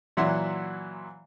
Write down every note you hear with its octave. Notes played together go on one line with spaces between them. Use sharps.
A#2 E3 F#3 E5 F#5 C6